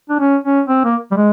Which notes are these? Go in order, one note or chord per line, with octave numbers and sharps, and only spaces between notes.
D4
C#4
C#4
C4
A#3
G3
G#3